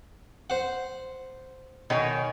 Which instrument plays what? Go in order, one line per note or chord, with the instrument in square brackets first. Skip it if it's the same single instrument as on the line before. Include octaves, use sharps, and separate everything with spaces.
[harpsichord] C5 F#5
[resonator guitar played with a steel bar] B2 C#5 G#5 [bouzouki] D#3